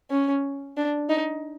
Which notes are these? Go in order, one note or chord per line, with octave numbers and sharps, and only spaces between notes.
C#4
D4
D#4